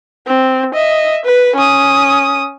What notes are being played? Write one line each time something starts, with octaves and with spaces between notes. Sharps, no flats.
C4
D#5 E5
B4
C#4 D#6